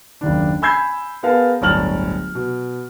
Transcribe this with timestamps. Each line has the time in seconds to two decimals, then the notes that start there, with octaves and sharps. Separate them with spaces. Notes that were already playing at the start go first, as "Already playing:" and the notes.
0.21 F#1 D#2 D4
0.62 G#5 B5 E6 G6 G#6 C7
1.23 B3 G#4 A#4 F5 G#5 A5
1.61 D1 G1 C#5 A5 F6 F#7
2.35 B2